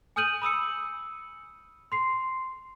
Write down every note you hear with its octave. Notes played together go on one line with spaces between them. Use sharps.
G#5 D#6 F6 G6 D#7 F#7
B5 D#6 E6 C#7
C6 C7